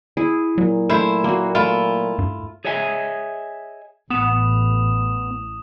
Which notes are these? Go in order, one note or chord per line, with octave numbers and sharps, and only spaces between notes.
E4 G#4
A#2 F#3
A3 E4 C5
A#3 F#4
A3 E4 F4
G2
G#4 C#5 D#5 E5 G#5
A1 B3 D#6 E7